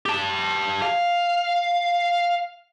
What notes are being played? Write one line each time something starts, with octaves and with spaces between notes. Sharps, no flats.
G4 A5
F5